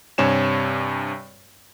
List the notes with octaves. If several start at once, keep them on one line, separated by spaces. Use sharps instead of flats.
G2 C3 C#5 G#5 E7